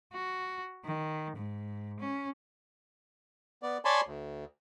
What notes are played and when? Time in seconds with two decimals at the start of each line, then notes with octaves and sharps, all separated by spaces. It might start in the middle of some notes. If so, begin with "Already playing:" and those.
0.13 F#4
0.85 D#3
1.37 G#2
2.00 C#4
3.63 B3 D5
3.85 C#5 D5 G#5 A5 B5 C6
4.07 D2